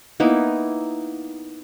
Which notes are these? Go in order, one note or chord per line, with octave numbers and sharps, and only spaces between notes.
A#3 B3 D#4 E4